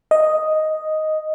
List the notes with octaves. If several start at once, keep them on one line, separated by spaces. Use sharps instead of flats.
D#5